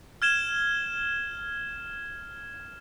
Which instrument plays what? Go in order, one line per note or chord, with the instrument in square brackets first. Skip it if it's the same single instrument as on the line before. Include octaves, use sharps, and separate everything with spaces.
[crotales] F6 G#6 E7 G7